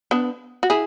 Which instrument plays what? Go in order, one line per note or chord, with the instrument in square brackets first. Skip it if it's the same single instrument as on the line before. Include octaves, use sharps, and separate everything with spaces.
[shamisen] B3 D4
F#4
E4 G#4